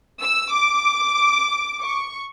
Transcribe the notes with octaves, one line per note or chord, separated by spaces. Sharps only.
E6
D6
C#6